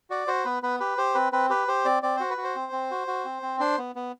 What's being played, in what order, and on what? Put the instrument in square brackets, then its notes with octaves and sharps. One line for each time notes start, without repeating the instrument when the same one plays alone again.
[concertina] F#4 D5
F#4 C5
B3 B4
B3 B4
G4 B4
G4 C5
C4 B4
C4 B4
G4 B4
G4 C5
C4 D5
C4 D5
F#4 C5
B4
F#4
C5
C4
C4
F#4
F#4
C4
C4
D4 C5
B3
B3